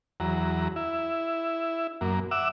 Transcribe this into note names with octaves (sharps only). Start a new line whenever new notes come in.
E2 F#3 A#5
E4
F#2 A#3
E5 F#5 D6 E6